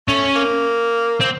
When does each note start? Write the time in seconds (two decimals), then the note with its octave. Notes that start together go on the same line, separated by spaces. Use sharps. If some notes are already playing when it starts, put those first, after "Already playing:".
0.08 A3 C#4
0.36 A#3
1.20 C4